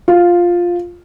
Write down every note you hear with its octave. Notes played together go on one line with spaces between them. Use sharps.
F4